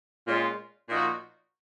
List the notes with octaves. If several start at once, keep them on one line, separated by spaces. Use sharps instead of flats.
A#2 G#3 C#4 F4
A#2 F3 A#3 D#4 F#4